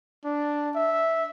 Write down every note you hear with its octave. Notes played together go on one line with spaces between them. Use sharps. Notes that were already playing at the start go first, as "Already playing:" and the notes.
D4
E5